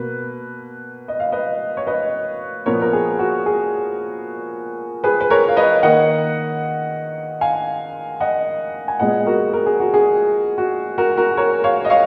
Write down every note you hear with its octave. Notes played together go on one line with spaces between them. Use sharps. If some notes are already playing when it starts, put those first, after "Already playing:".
Already playing: B2 A#3 B4
D#5
F5
B4 D#5
C#5
B4 D#5
A#2 F3 B3 A#4 C#5
A#4
G#4
F#4
G#4
G#4 B4
B4
A#4 C#5
F5
B4 D#5
D#3 A#3 D#5 F#5
F5 G#5
D#5 F#5
G#5
A#2 G#3 B3 D#5 F#5
F#4 A#4
A#4
G#4
F#4
G#4
F#4
F#4 A#4
F#4 A#4
A#4 C#5
C#5 F5
D#5
C#5 F5